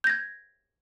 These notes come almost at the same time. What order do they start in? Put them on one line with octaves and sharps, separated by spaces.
G6 A#6 G#6